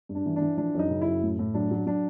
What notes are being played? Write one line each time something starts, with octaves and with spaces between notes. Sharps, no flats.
G2
D4
E3
E3 D4
F3 D4
F#2 D#4
C#3
F#2 E4
A2
A2
F#3 D4
F#3
F#3 D4